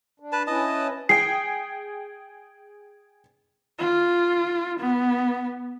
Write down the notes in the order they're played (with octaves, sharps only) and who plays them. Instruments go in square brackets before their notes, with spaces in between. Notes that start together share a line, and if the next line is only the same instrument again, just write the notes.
[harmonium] D4
[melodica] B4 A5
[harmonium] C#4 E4 B4 [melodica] D#5 A5
[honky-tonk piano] G#4 G5 [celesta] C7
[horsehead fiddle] F4
B3